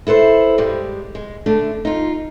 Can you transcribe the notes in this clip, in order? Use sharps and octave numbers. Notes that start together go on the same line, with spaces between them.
E4 A4 B4 C5
G2 G3 G#3
G#3
D3 A3 D4
D#4 F4